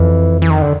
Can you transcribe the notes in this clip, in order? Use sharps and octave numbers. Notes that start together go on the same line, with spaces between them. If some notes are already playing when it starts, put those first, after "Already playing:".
Already playing: F2 E3
E3
D#3
D3